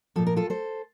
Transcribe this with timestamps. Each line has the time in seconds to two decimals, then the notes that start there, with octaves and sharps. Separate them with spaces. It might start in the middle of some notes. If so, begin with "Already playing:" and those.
0.16 A#2 F3 A4
0.27 A#4
0.36 F4 A4
0.50 A4 C5